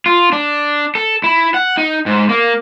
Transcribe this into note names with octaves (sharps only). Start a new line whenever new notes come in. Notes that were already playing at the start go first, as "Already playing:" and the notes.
F4
D4
A4
E4
F#5
D#4
G#2
A#3